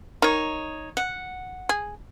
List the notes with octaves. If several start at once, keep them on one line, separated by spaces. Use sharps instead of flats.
D#3 D#4 C#5
F#5
G#4